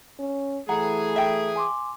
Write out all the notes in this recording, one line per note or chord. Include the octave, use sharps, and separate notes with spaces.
C#4
E3 A3 G#4 F#5 A#5
E5 G5
G#5 C6 D6